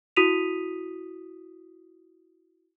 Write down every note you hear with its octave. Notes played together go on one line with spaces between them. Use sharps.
E4 F#4 D#6 B6 D#7 F7